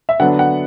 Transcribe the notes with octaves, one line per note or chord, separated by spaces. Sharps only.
E5
D3 F#3 B3 D4 F#5
F#5